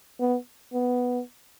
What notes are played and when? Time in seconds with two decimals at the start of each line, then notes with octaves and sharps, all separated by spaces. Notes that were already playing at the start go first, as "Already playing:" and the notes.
0.20 B3
0.73 B3